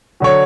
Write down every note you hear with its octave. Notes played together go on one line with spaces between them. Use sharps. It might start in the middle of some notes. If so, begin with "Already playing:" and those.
D3 F#3 C#5